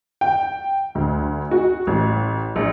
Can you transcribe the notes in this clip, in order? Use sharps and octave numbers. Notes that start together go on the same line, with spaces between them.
G5
D2
F#4
A1
A#1